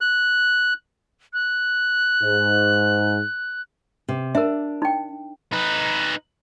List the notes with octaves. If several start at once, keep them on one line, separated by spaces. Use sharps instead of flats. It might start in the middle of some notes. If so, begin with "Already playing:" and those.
F#6
F#6
G#2
C3
D4 A#4 E5
D#4 G5
D#4 B4